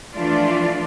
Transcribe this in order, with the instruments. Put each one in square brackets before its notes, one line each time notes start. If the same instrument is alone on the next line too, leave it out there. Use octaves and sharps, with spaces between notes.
[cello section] E3 F3 A3 D4 F4 D5